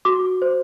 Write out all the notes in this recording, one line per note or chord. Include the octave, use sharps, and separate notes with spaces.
F#4 D6
C5